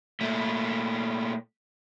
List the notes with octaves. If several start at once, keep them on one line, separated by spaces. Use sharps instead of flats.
A#2 A3